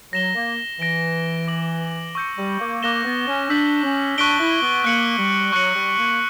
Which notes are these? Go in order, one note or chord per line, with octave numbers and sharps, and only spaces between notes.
F#3 A#6 E7 G7
A#3
E3 A#6 D7 G7
D6 A#6 D7 F#7
C#6 E6 G6 C#7
G3
A#3
A#3 D6 F#6 A#6 E7 G7
B3
C#4
D4 E6 G6 B6 F#7
C#4
D4 C#6 F#6 B6 D7 G7
E4
B3
A#3 F#6 C#7 F#7
G3
F#3 C#6 F#6 C#7 F#7
G3
A#3